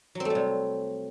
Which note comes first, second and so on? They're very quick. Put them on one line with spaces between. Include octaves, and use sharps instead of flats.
F#3 C4 A3 G3 C3